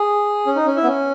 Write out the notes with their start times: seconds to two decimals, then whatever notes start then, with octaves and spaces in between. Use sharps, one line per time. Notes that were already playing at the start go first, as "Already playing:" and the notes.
Already playing: G#4
0.46 C#4
0.56 D#4
0.67 C#4
0.77 E4
0.83 B3
0.87 C#4